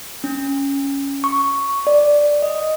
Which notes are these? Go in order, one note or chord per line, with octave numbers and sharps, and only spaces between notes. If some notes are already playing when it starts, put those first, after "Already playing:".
C#4
C#6
D5
D#5